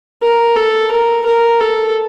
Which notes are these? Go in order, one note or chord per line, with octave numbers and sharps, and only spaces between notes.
A#4
A4
A#4
A#4
A4